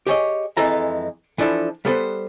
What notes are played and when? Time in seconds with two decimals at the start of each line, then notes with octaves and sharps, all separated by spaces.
0.07 G4 G#4 C#5 D#5
0.57 F2 E3 G#3 A4 A#5
1.38 E3 F3 D4 E4 A4
1.85 G3 B3 A4 B4 C5